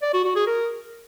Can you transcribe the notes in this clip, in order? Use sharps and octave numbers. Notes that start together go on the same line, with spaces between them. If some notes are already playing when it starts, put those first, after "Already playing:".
D5
F#4
F#4
G#4
A#4